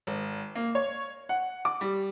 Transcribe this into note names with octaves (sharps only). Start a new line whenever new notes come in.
G#1
A#3
C#5
F#5
D6
G3